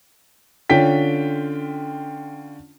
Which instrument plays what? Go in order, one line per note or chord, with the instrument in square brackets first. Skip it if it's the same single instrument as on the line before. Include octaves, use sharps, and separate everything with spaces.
[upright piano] D3 C#4 F4 G5 B6